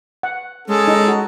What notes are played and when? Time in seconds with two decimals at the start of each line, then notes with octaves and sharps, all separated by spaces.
0.23 F#5
0.68 G#3 C#4 A4
0.88 D#4
1.08 F#4